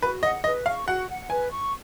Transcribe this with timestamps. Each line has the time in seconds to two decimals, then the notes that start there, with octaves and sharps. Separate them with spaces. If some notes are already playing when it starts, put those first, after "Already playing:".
0.02 F#4 B4
0.23 D#5 F#5
0.44 B4 D#5
0.66 F5 C#6
0.87 F#4 F#5
1.08 F#5
1.30 B4 G#5
1.50 C#6